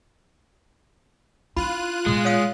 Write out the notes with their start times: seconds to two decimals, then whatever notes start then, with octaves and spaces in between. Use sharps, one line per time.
1.57 D4 E4 F4 B5 F#6 D#7
2.06 A#2 G#3 B3
2.25 C#5 F5 D#6